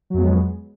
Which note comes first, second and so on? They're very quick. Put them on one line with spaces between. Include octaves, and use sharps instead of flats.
F#3 F2 B3 G#3